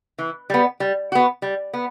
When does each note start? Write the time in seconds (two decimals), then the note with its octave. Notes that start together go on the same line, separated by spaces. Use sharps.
0.19 E3
0.50 G3 B3
0.80 G3
1.12 B3 F#4
1.42 G3
1.73 B3